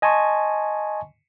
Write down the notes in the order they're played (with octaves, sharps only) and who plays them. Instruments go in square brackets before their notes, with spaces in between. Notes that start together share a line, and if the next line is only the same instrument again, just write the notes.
[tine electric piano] D#5 G#5 A5 C6 C#6